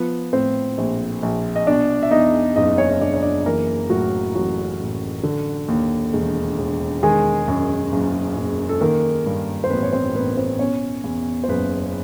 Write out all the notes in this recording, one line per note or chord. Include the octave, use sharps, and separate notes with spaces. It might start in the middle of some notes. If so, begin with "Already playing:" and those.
Already playing: F3 B3 B4
A2 C4 C5
A#1
A#1
D#5
B2 D4 D5
E5
E2 D#4 D#5
F#1 D#4 D#5
C#4 C#5
F#1 D4 D5
C#5
D4 D5
E3 A#3 A#4
A2 F#3 F#4
A1 F#3 F#4
A1
D3
D#2
E1
E1
D#3 G#3 G#4
F#2
F#1
F#1
A4
D#3 A#3 A#4
G2
C5
A1 B3 B4
C#5
C4 C5
A1 B3 B4
C4 C5
B2 C#4 C#5
E2
C5
F#1 B3 B4